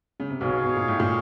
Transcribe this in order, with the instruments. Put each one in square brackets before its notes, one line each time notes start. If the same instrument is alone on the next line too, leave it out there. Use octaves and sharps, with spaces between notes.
[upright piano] C#3
C3
[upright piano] B1 B2 [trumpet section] D#4 G#4 C#5 F5
[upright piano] B2
A#2
A2
A#2